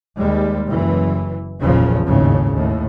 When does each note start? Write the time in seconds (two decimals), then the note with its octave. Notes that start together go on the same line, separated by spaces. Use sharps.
0.18 D#2 G3 G#3
0.68 F#1 E3
1.62 F#1 B1 E2 A#2 C#3 F3
2.05 G#1 D#2 A2 C#3
2.51 D#2 A2